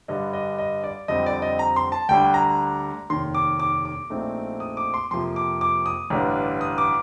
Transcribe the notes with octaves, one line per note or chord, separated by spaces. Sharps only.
G2 D3 G3 D#5
D#5
D#5
D5
F2 D3 G3 C4 D#5
D5
D#5
A#5
C6
A5
D2 D3 G3 D4 G5
A#5
F1 D#2 D#3 C6
D6
D6
D6
A#1 A#2 A3 C4 D#4
D#6
D6
C6
F2 C3 F3 A#3 C6
D6
D6
D#6
A1 G2 D3
D#6
D6